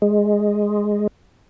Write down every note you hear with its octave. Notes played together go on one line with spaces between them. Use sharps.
G#3